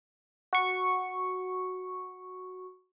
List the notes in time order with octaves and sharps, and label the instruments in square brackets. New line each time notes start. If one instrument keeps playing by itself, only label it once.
[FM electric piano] F#4 C#6